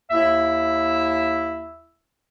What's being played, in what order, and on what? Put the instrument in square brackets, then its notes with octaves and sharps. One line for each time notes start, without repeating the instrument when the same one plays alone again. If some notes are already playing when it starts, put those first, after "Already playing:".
[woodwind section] D#2 E4 E5